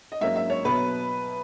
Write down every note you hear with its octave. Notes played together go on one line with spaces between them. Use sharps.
D#5
G#2 F#3 A#3 C#4 E5
E5
C#5
B2 F#3 B3 B4